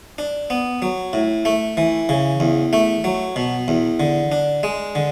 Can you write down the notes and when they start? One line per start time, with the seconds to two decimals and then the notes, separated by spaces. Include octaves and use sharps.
0.18 D4
0.50 B3
0.82 F#3
1.13 A2
1.45 A3
1.77 E3
2.09 C#3
2.40 E2
2.73 A3
3.04 F#3
3.36 B2
3.68 E2
4.00 D3
4.32 D4
4.63 G#3
4.95 D3